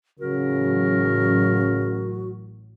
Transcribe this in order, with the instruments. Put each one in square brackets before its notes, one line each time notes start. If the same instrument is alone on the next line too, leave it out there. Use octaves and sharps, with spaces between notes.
[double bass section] A1 F#3 [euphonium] C#3 [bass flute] F#4 [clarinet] A#4